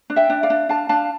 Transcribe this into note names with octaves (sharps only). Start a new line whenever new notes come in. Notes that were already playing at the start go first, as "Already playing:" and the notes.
D4
E5 G5
D4
D5 F5
D4
D4 F5 A5
D4 F5 A5